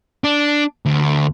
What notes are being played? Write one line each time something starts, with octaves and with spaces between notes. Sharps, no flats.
D4
D2